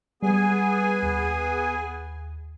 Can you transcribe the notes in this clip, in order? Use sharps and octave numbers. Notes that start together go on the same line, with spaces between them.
G3 B3 G#4 G#5
D#2